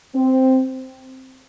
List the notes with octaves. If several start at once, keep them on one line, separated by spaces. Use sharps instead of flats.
C4